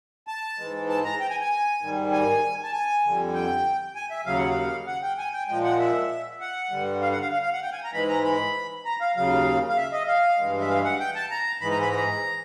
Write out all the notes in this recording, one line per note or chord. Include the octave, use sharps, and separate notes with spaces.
A5
G#2 E3 G#3
A5
A#5
G5
G#5
G#5
G#2 D#3 G3
G#5
A5
G#5
F2 D3 G3
G5
G#5
E5
D#2 C#3 F#3 F5
F#5
F5
F#5
G5
G#5
G5
A#2 F3 G#3 G5
F#5
E5
F#5
G2 D3 G3
F5
F#5
F5
F5
F5
F#5
G5
G#5
A#5
G#2 E3 G#3 B5
A#5
B5
A#5
F5
D#2 C#3 F#3 F5
F5
E5
D#5
F5
G2 E3 G#3
E5
F5
F#5
G5
A5
A#5
G#2 E3 G#3 B5
A#5
B5
A#5